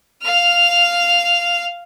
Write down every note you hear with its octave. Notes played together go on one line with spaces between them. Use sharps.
F5 F6